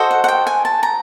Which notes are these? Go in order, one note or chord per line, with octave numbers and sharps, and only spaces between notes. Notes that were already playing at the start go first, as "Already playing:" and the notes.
Already playing: F#4 A4 C5 D#5
F#5
F#5
G5
G#5
A5
A#5